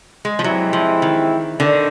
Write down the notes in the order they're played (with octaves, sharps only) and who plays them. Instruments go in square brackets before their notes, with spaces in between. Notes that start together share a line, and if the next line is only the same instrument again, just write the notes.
[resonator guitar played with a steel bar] G#3
F3
[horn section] E3 G#3 C4 E4 G4 [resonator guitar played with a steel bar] F#3
[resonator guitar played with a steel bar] F3
D#3
[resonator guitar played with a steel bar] D3 [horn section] D#3